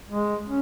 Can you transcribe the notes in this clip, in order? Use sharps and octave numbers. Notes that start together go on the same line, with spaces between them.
G#3
C#4